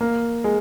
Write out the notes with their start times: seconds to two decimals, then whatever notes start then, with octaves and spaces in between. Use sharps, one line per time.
0.01 A#3
0.44 G#3